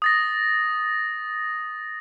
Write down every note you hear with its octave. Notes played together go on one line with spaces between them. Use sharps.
D#6 A6 A#6